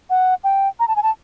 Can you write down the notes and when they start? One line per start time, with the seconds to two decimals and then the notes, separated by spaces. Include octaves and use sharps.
0.10 F#5
0.44 G5
0.80 A#5
0.88 A5
0.96 G#5
1.03 A5